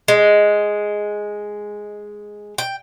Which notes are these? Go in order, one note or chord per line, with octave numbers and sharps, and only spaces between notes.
G#3
G5